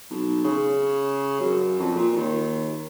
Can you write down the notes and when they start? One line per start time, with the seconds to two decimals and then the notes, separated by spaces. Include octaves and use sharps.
0.10 B1
0.44 C#3
1.40 F#2
1.79 F2
1.96 A#2
2.16 D#2